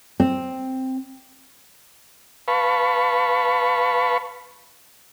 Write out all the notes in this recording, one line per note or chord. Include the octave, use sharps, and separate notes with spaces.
C4
B4 F5 A5 B5 C#6